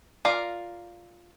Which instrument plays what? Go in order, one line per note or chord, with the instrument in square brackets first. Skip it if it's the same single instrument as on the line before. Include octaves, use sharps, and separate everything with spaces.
[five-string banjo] F4 A#4 D5 F5 A#5